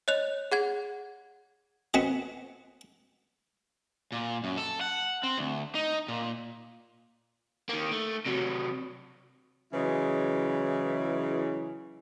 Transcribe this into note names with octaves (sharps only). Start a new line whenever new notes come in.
C#5 D#5 F#6 F7
G#4 F#5 G#6
B3 C4 F#4 D#5
A#2
F#2
A4
F#5
C4
D2
D#4
A#2
D#3 A#3
A3
C3 F#3
C#3 E3 F#3 G#3 E4